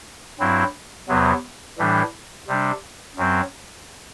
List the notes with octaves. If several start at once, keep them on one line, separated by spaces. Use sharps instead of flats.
G2 F#3 C4 E4
E2 C3 F#3 B3
A2 E3 G3 D4
C3 G3 D4
F#2 F#3 C4